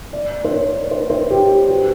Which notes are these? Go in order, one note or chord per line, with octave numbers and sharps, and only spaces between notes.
D5
C5
C#5
C5
B4
C5
G4
F#4
G4